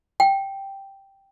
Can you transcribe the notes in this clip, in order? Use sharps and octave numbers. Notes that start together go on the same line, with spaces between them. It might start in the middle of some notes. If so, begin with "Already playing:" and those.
G5